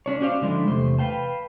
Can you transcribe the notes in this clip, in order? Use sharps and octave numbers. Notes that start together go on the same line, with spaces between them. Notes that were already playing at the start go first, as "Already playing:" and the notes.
C#4 D4 C#5
C#4 F#4 C5 D5 F5
D3 F3 G#3 D4 E4
E2 C3 A3 C5
B4 F5 G5 A5